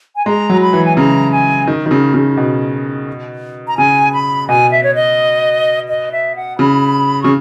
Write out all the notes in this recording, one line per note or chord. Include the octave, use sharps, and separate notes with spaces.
G#5
G#3 A#5
F#3
B5
E3
G#5
C#3 A#5
G#5
D#3
D#3
C#3
C#3
B2
A#5
C#3 G#5
B5
B2 G#5
E5
C#5
D#5
D#5
E5
F#5
C#3 B5
C#3 C#6